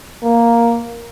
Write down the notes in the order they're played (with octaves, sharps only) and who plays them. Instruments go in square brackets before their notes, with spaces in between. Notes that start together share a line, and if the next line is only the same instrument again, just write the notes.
[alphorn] A#3